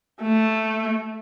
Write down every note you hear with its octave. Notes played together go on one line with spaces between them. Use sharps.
A3